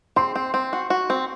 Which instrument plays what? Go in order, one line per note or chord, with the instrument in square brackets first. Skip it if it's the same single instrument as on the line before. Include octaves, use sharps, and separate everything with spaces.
[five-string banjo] C4 [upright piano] C6
[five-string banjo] C4
C4
F#4
F#4
C4